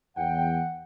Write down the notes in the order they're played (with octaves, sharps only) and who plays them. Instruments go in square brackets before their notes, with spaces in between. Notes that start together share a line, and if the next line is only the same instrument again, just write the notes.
[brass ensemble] E2 G5 [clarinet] F#5